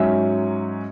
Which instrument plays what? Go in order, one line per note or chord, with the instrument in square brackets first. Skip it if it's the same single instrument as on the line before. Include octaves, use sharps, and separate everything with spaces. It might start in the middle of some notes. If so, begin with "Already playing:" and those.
Already playing: [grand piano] G#2 F#3 C#4 [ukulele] E5